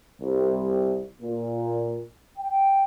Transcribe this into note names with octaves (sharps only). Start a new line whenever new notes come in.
C2
A#2
G5